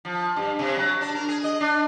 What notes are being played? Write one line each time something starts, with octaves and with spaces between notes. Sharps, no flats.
F3
G2
C3
F#3
D4
A#4
G#4
D#5
D4